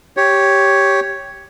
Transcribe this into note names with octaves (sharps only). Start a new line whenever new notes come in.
G4 C#5